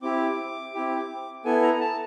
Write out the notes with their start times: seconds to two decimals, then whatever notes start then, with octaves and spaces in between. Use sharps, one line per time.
0.02 C4 E4 G4 D6
0.73 C4 E4 G4
1.45 B3 E4 A4 G#5
1.63 A#5
1.81 A5